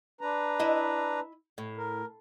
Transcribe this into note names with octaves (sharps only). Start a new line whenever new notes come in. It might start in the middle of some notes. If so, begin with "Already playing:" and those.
D4 B4 A#5
E4 D#5
A2
A#4